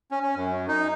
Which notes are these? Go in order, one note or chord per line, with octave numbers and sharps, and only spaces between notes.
C#4
C#4
F#2
D#4